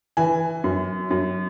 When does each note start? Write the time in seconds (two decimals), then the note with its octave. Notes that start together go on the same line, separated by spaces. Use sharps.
0.17 E3 G#5
0.64 F#2
1.10 F#2